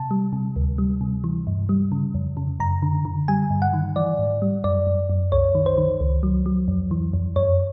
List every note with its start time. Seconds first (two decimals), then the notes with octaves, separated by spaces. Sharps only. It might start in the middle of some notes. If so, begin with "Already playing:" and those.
Already playing: C3 A5
0.11 G3
0.33 C3
0.56 D2
0.78 G3
1.01 C3
1.24 E3
1.47 G2
1.69 G3
1.92 C#3
2.14 F2
2.37 C#3
2.60 F#2 A#5
2.82 D3
3.05 D3
3.28 G3 G#5
3.50 G2
3.62 F#5
3.73 D#3
3.96 E3 D5
4.19 G#2
4.42 G3
4.64 F#2 D5
4.87 F#2
5.10 F#2
5.32 C2 C#5
5.55 D#3
5.66 C5
5.78 D#3
6.00 C#2
6.23 F#3
6.46 F#3
6.68 F2
6.91 E3
7.13 F2
7.36 F#2 C#5